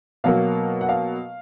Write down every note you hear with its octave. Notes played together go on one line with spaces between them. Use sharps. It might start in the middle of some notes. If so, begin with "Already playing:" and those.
B2 F#3 A#3 F5
F#5
F5